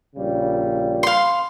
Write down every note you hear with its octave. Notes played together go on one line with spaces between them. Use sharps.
A#1 C#3 G3
F5 C6